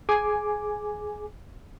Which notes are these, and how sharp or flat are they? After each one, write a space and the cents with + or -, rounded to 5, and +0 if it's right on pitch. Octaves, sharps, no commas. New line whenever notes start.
G#4 +20 G#5 +0 D6 +0